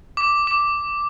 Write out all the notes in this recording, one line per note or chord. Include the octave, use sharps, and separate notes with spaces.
D6
D6